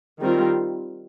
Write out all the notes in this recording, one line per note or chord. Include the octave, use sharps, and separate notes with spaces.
D#3 G3 C4 F4 A#4